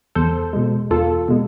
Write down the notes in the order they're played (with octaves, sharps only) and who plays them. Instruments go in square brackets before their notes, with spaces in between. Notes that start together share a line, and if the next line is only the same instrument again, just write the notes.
[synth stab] E2 A4 C5
B2 G#3
E2 F4 A4
B2 G#3